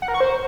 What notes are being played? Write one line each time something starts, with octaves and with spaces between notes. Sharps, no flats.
F#5
A#4
C#6
C5